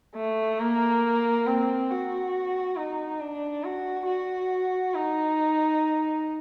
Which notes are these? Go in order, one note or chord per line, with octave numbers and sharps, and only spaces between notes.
A3
A#3
C4
F#4
D#4
D4
F#4
F#4
D#4